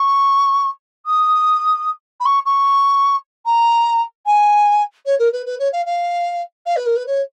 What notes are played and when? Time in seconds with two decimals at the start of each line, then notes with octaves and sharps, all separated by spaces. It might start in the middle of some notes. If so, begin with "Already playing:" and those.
Already playing: C#6
1.06 D#6
2.20 B5
2.25 C#6
2.45 C#6
3.45 A#5
4.26 G#5
5.05 C#5
5.19 A#4
5.32 B4
5.46 B4
5.59 C#5
5.72 F5
5.85 F5
6.66 F5
6.76 B4
6.86 A#4
6.96 B4
7.06 C#5